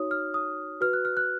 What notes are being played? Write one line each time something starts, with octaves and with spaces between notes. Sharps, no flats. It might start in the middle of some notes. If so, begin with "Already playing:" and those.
Already playing: D#4 F#4 C#5 D#6
F6
D#6
F#4 B4 F6
F#6
F6
F#6